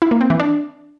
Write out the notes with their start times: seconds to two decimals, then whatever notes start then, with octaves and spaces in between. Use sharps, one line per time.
0.02 E4
0.11 A#3
0.21 C4
0.30 E3
0.40 D4